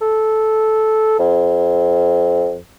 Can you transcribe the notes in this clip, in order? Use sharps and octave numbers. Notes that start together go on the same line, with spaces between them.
A4
F2